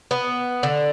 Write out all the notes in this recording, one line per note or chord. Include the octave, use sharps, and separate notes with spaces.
B3
D3